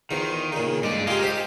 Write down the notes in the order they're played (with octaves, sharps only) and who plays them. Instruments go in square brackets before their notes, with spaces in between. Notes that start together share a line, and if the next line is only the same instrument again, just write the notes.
[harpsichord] E2 F3 [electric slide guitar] D#3
[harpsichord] A#2 C#3
[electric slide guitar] G2 D5 [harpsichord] G#3
[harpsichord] F4 G4 [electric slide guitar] G#4 A#4 F5
[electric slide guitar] G4 [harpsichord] C5 D#5